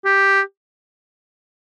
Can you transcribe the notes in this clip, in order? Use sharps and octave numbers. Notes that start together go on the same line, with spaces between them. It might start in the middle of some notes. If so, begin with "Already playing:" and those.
G4